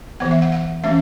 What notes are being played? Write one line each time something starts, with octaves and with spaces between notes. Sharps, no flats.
E3 B3 F#5
E5
F#5
F#5
E3 A3 C#4 E5